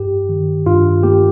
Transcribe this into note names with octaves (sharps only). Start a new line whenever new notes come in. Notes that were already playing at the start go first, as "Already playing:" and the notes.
Already playing: G2 G4
D#3
G2 F4
A#3 G4